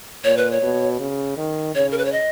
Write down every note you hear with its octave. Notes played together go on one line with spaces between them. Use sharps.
A#2 C#5
B4
C#5
B2
C#3
D#3
C#3 C#5
A#4
B4
C#5
D#5